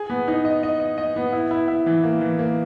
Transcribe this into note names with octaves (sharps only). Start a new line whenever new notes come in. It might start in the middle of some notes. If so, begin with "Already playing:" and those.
Already playing: G#4
B3
D#4
D#5
D#5
D#5
D#5
B3
E4
E4
E4
E3
A#3
E3
A#3